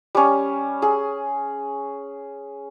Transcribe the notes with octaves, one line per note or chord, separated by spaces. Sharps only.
G3 C#4
G#4